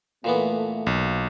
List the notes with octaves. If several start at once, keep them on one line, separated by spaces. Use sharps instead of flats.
A#2 E3 A3 B3
B1